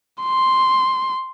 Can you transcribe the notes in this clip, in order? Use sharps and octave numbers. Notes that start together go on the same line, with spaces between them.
C6